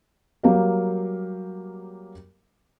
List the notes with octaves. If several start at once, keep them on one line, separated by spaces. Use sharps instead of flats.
F#3 G3 A#3 G4 A#4 F5